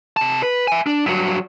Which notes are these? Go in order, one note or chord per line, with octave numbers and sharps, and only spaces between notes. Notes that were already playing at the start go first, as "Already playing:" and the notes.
C3 A5
B4
E5 G#5
D4
G2 F#3